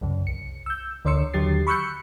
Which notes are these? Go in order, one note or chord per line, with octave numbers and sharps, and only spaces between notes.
C2 F#2 C#3
C2 C#7
E6 G6
D2 D3 C#5 C6 E6 C#7
D#2 D3 F#3 G4 A6 C7
B5 C#6 E6 F#6 G6 C#7